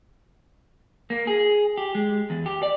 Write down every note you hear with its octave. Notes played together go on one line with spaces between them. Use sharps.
A#3
G#4
G4
G#3
E2
G4
D5